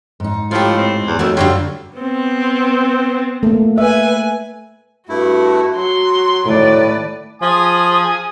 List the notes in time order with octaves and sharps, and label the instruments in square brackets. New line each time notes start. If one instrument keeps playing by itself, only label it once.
[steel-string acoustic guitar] G#2 D#4
[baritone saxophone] A2 [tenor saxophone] F3 [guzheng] F4 G4
[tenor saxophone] C4
[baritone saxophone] E2
[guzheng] F2 F#4 A4 [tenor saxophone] D#3 [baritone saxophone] F#3 [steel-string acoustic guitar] A3
[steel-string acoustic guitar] F#2 [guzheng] D3 G3 G4 [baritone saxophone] F#3 [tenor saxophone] F4
[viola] B3 C4
[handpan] A3 A#3
[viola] B4 G#5 [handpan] E5
[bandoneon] G2 A3 E4 [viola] F#4
[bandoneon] F#3 [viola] F#4 C6
[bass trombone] A2 [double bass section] D#3 A3 [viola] B4 D5
[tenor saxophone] F3 [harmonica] G#5 D#6